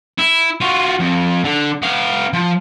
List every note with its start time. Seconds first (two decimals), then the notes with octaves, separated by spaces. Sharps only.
0.18 E4
0.61 F4 F#4
0.99 F2
1.44 D3
1.82 B3 F5
2.33 F3